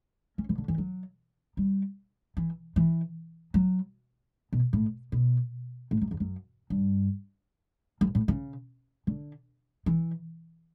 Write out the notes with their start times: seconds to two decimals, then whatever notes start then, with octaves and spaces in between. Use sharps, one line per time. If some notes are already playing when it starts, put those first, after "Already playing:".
0.38 C#4
0.49 E3
0.58 D3
0.68 E3
0.78 F#3
1.57 G3
2.37 E3
2.76 E3
3.54 F#3
4.52 B2
4.73 A2
5.12 B2
5.91 A2
6.01 F#2
6.11 E2
6.20 F#2
6.70 G2
8.01 F#2
8.15 A2
8.28 C#3
9.07 D3
9.86 E3